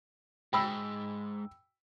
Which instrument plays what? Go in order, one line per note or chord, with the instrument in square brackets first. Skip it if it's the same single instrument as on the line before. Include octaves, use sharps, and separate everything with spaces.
[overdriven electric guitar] G#2 [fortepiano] G5 B5 E6